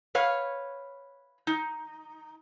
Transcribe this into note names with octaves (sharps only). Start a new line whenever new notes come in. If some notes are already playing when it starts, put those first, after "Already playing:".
B4 C#5 F5
D#4